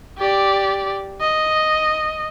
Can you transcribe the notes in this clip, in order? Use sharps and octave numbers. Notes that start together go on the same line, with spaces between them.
G4 D5
D#5